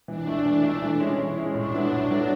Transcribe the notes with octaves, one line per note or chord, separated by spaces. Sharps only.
E3 D4
A3 E4
E3
A3 E4
E3
G#3 C#4 E4
E3
G#3 C#4 E4
A2 D4
F#3 B3 E4
A2
F#3 B3 E4